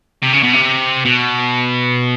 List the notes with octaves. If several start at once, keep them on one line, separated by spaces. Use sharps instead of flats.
C3
C#3
B2
C3
B2